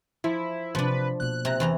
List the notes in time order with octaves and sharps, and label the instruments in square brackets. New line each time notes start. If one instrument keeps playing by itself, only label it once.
[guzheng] F3 [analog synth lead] E4
[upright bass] C3 [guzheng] F3 D4 [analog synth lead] B4
[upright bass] B2 A#3 [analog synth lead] F#6
[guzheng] C3 A#5
E2 E3 A#5